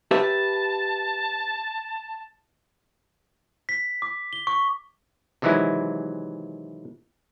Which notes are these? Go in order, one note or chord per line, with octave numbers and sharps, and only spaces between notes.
G4 B4 E5 A5
B6
D6
G7
C#6
C3 D#3 E3 F#3 G#3 E4